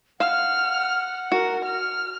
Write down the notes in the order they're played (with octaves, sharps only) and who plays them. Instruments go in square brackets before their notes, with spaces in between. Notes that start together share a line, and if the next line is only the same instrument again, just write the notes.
[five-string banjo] F5 [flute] F#5 [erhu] F6
[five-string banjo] F#4 [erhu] A#4
[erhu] F6